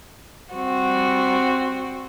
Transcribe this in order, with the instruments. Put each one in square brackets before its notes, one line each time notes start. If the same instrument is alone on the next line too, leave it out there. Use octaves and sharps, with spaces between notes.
[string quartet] G3 C4 F#4